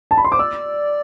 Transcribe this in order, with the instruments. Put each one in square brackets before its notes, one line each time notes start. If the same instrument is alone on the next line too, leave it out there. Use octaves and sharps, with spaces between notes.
[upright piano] A5
B5
C6
[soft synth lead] C5 [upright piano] D6
[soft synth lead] D5 [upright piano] E6